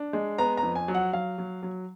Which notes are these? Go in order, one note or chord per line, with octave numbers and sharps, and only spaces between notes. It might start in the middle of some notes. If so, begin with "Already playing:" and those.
Already playing: D4
G#3
B3 A#5
A#5
F2
G#5
F#3
F#5
F#3 F5
F#3
F#3